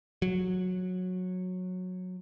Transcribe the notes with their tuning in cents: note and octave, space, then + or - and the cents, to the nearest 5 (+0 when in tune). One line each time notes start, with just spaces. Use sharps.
F#3 -15